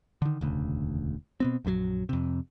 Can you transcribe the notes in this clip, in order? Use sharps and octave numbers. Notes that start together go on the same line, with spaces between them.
D3 D#3
E1 D2 C#3
B2 B3 C4
A#1 F#2 D3 F#3
F2 C3